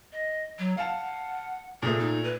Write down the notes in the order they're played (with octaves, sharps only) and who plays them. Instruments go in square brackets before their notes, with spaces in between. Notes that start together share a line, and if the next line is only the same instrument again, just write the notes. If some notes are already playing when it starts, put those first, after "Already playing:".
[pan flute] D#5
F#3
[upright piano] F5 A5 [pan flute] F#5
[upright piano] A#2 A3 [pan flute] G#4
[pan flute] D#4
B4